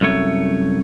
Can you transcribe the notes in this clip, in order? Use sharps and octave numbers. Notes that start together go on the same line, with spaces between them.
C2 F#2 A3 C#5